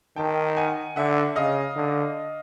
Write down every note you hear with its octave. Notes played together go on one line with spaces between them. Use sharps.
D#3 G5 A5
F#5 G#5
D3 E5 F#5
C#3 D#5 F5
D3